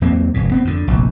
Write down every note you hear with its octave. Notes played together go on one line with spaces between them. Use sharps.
E2 F#3 A#3 C4
F1 G#2
B3 C4
F2 D3
F1 A#1 E2